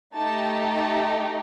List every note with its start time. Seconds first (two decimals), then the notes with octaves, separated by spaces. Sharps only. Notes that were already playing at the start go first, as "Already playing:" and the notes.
0.16 A3 D#4 G4 A5
0.65 A5